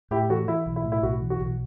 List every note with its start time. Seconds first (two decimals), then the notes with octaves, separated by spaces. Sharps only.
0.11 A2 E4 G4
0.30 E3 F#4 A4
0.48 E3 E4
0.66 B1
0.76 E4
0.84 A2
0.92 E4
1.03 B1 F#4
1.21 E3
1.30 F#4
1.40 B1